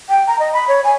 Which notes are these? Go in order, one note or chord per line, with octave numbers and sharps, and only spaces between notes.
G5
A#5
D#5
B5
C#5
G#5